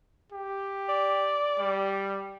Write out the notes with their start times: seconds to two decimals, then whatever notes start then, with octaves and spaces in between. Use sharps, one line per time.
0.32 G4
0.89 D5
1.58 G3